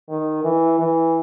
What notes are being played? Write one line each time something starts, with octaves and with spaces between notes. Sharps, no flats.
D#3
E3
E3